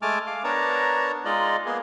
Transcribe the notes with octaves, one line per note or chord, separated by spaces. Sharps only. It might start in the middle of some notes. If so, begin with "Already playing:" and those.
G#3 A3 G#5 A5 D6 F6
F5 D6
B3 D4 A#4 C#5 A5 A#5
G#3 D#4 F4 D5 D#5
A#3 B3 G#4